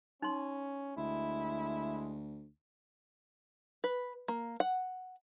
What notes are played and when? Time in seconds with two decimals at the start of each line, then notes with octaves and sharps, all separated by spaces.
0.22 C#4 D#4 C6
0.97 D2 G#3 E4
3.84 B4
4.28 A#3
4.60 F#5